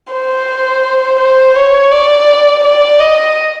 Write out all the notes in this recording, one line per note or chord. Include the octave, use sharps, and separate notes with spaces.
C5
C5
C#5
D5
D5
D#5